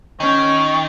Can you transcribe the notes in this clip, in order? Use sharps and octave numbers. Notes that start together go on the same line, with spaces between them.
D#3 C#4